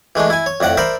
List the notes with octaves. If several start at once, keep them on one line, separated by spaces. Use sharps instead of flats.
E3 G#3 A3 D4
E4 G#5
C#5
F2 A2 D5 F#5 D6
A#4 C5 D5 E5 B5